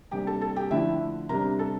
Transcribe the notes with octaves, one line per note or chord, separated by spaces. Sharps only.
C3 G3 A#3 D4 G4 G5
A4 A5
A4 A5
G4 G5
D3 F3 A3 D4 E4 E5
C3 G3 D4 A#4 A#5
A4 A5